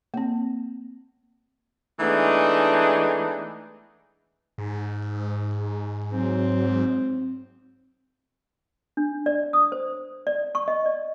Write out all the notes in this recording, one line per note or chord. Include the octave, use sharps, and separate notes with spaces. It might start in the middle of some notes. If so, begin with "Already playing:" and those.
A#3 C4
E3 G#3 A3 B3 D4 D#4
G#2
F#3 C4
D4
D5
D#6
C5
D5
C#6
D#5
D5